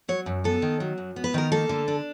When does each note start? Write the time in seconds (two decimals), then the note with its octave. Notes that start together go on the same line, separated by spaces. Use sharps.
0.08 F#3 C#5
0.26 F#2
0.44 B3 A4
0.62 D#3
0.80 F#3
0.98 F#2
1.16 B3
1.24 B4
1.34 D#3 A#4
1.52 A#3 A4
1.69 D3
1.88 D4